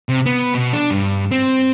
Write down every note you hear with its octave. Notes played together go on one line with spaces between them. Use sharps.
C3
B3
B2
D4
G2
C4